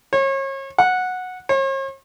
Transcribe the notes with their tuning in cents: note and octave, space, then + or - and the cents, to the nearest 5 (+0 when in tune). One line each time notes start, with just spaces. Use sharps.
C#5 -35
F#5 -10
C#5 -45